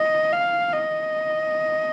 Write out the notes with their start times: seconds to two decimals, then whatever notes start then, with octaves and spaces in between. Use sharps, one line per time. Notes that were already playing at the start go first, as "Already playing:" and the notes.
Already playing: D#5
0.33 F5
0.73 D#5